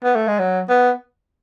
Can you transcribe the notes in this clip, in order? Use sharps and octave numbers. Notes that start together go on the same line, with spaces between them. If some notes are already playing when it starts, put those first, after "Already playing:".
B3
A3
G#3
F#3
B3